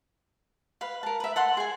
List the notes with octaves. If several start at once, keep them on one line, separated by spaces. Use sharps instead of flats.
B4 F5
A#4 A5
B4 E5
A4 F#5 C6
G#4 G#5